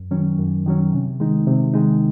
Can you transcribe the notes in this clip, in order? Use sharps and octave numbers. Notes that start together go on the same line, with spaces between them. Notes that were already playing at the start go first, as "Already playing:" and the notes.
Already playing: F#2
D#3 F#3 C#4
F#2
D#3 F#3 C#4
C3
D#3 G#3 D#4
C3
D#3 G#3 D#4